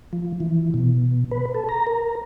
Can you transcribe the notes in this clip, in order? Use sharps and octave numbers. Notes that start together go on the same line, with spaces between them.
F3
E3
B2
B4
A4
A#5
A#4